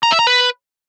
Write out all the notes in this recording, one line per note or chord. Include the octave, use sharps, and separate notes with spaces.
A#5
E5
A#5
B4